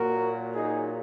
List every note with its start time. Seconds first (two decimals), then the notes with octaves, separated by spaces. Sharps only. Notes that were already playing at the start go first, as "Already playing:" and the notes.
Already playing: A#2 F#3 A#3 F#4 A#4
0.55 D#4 G#4